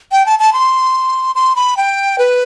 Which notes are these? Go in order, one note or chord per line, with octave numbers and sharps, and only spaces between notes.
G5
A5
A5
C6
C6
B5
G5
B4